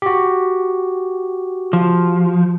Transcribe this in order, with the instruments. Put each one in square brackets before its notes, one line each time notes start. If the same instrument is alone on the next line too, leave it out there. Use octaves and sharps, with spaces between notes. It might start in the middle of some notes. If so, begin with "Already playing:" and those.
[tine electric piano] F#4 G4
[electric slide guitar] F3